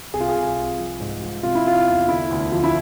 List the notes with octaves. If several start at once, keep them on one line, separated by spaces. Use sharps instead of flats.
C2 G#4
F4
G#4
C2
C2
F3
G#2
F3
C3 F4
E4
C3 F4
E2
D3 E4
D2
F3
E4